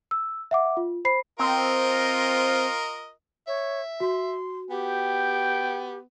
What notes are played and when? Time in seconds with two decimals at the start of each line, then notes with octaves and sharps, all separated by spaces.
0.11 E6
0.51 E5 F#5 D6
0.77 F4
1.05 C5 B5 C7
1.39 C4 F4 A#4 D#5
3.47 C#5 E5
4.00 F#4 C6
4.70 B3 G4 G5